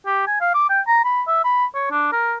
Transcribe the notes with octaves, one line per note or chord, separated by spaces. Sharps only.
G4
G#5
F5
D6
G5
A#5
B5
E5
B5
C#5
D4
A#4